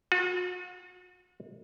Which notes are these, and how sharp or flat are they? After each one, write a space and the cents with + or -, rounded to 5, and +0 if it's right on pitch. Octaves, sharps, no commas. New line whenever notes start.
F#4 -40